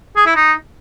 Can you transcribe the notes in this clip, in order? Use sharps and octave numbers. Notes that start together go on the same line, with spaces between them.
G#4
E4
D#4